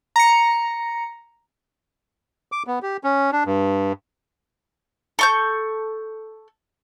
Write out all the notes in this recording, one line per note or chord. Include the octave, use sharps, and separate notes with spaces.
A#5 C#7
D6
B3
G4
C#4
D4
G2
A4 C#6 G6